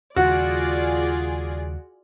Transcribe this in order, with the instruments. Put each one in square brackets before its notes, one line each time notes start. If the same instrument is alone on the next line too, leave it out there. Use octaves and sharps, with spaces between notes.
[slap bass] D#2 C#3 G3 [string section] F4 G#4 D5 [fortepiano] F#4